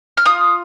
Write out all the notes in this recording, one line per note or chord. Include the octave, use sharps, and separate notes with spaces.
F6
F4 D#6